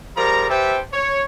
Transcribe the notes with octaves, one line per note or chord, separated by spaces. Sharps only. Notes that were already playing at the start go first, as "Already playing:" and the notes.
F3 G3 G#4 A#4 A#5
G4 A4 B4 C5 E5 G5
C#5